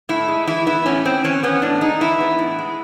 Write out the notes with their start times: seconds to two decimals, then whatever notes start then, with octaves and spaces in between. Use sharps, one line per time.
0.09 A2 E4
0.28 G#3
0.47 E3 E4
0.66 B3 E4
0.86 A2 C#4
1.05 G#3 C4
1.24 E3 C#4
1.43 B3 C#4
1.62 A2 D4
1.81 G#3 D#4
2.01 E3 E4
2.20 B3
2.39 A2
2.59 G#3